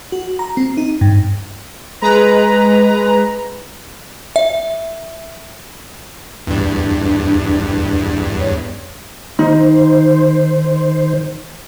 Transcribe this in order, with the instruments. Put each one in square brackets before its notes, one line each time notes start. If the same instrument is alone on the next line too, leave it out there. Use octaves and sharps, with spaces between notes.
[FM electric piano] F#4
A#5
C4
D#4
G2
[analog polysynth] G#3 B4 A#5
[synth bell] E5
[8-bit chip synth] E2 G2 [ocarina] D4
[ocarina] C#5
[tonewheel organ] D#3 C5 [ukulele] D#4